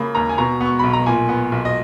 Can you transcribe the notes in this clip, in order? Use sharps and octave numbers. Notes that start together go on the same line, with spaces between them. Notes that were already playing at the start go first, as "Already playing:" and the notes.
Already playing: C#3 A#3 B5
D#2 A#5
G#5
B2 A#5
B3 C#6
B1 B5
A#5
A#2 G#5
B3
B1
D#5